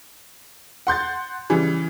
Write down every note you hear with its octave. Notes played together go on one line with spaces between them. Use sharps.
F#5 C6 G6 A6
C#3 E3 G3